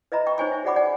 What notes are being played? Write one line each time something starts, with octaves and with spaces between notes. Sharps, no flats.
B4 D#5 E5 A#5 B5
G5 C#6
D#4 C5 C#5 G#5 C#6
E5
F#4 G#4 D5 F#5 B5 D6
D5 F#5 G#5